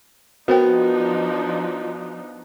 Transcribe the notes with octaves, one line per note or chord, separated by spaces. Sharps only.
F3 B3 D4 D#4 F#4 A#4 C5 G5